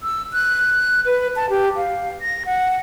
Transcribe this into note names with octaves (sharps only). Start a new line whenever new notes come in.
E6
F#6
B4
A5
G4
F5
A#6
F#5